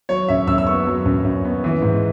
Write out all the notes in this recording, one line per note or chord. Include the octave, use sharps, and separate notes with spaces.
F#3 C#5
F#2 E5
F#2 E6
E6
B3 C#6
F#3
F#2
F#2
B3
E3
G#2